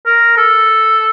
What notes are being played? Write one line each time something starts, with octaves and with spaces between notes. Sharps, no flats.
A#4
A4